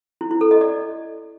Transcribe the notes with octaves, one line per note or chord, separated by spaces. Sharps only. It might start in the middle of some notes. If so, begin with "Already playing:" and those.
E4
E4
A4
D#5
D5